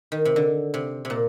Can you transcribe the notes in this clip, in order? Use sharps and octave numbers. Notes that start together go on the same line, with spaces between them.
D#3
C3
D3
C3
C3
A#2